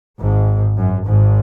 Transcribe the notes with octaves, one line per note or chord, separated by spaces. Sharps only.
G#1 G#2
F#2
G#1 G#2